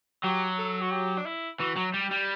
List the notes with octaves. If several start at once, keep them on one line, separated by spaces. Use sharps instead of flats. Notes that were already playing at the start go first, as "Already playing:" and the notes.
F#3 G4
A4
F#4
G4
D4
E4
E3 F#4
F#3
G3 G4
G3